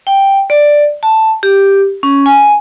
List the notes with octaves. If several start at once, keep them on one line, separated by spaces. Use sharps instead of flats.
G5
D5
A5
G4
C#4
G#5